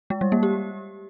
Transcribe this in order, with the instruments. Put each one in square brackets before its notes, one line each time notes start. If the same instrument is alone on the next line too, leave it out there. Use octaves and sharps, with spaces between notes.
[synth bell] G#3
G3
A#3
G4